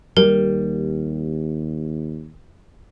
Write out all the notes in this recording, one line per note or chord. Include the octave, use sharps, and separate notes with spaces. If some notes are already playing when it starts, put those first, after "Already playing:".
D#2 G3 A#4